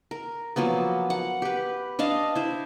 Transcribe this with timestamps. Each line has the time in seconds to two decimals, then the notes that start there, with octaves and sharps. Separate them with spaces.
0.11 A#4
0.56 F3 F#3 A#3 B3
1.10 F#5
1.42 G4 B4
1.99 D4 D#5 F5 A5
2.35 E4 C5